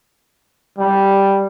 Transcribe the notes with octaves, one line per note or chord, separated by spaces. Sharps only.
G3